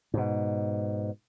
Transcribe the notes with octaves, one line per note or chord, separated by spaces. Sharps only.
G#2 B2